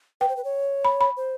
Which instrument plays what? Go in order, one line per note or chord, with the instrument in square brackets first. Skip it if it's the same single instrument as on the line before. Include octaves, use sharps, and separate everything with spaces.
[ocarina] B4 [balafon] G5
[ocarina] C5
B4
C#5
[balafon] B5
B5
[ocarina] C5